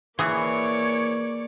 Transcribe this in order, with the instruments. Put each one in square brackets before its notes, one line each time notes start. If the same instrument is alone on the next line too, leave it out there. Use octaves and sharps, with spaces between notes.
[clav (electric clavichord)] E3 [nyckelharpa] A#3 D5 [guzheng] G#4 [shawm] C#5